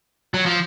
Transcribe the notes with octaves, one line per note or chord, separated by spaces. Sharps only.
F#3
F3